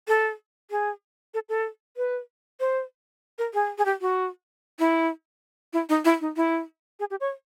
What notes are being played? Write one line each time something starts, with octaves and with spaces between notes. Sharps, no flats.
A4
G#4
A4
A4
B4
C5
A#4
G#4
G#4
G4
F#4
E4
E4
D#4
E4
D#4
E4
G#4
G4
C#5